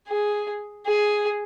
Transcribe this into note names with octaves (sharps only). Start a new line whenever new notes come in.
G#4
G#4